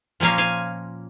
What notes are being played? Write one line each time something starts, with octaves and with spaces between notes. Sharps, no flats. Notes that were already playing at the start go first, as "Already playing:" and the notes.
A#2 F3 A#3 C#4 F5 G#5
F5 G#5